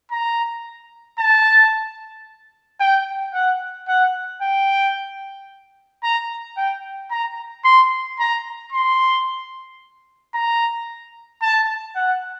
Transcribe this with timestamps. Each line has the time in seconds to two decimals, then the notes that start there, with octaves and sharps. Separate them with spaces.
0.11 A#5
1.19 A5
2.80 G5
3.34 F#5
3.88 F#5
4.42 G5
6.03 A#5
6.57 G5
7.11 A#5
7.65 C6
8.19 A#5
8.73 C6
10.34 A#5
11.42 A5
11.95 F#5